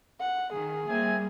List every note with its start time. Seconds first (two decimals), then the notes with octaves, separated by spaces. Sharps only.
0.21 F#5
0.53 D#3 G#4
0.88 G3 A#3 C4 E5 G#5